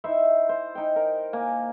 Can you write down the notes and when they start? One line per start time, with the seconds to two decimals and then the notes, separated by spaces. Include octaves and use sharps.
0.04 D#4 E4 C5 E5
0.49 C5
0.75 D#4 G5
0.96 A#4
1.33 A#3 G#5